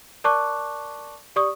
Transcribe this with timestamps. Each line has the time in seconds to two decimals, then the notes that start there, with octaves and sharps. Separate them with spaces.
0.24 A#4 D5 A5 C#6 D6 F#6
1.36 G4 D5 C#6 D#6